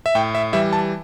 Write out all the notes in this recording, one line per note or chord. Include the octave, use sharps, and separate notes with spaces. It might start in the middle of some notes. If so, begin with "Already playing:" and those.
E5
A2 G5
E5
E3 G3 E5
A5